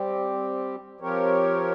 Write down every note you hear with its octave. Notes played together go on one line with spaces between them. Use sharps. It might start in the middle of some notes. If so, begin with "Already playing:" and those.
Already playing: G3 C4 G4
F3 C4 G4 A#4 C#5